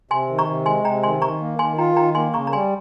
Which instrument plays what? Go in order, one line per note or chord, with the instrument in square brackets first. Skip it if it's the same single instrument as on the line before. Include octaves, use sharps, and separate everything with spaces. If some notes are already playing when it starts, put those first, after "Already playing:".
[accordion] C3 [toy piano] G#5 C6
[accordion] D#3
[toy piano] A#5 C#6
[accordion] C3
[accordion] G#3 [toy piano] G#5 C6
[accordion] C3 [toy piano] G5 A#5
[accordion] D#3 [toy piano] G#5 C6
[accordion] D#3 [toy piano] A#5 C#6
[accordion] A#3
[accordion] D#3 [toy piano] G#5 C6
[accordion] F4 [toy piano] G5 A#5
[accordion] D#3 [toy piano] G5 A#5
[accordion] A#3 [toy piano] G#5 C6
[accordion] C#3 [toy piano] A#5 C#6
[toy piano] A#5
[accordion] G3 [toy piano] G#5 C6